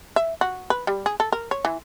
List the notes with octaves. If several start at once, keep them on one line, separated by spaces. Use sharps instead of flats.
E5
F#4
B4
G3
G#4
A4
A#4
C#5
E3